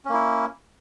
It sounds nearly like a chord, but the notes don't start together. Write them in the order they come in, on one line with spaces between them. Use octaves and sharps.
C#4 A#3 E4